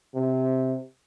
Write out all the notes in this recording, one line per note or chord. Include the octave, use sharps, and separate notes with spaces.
C3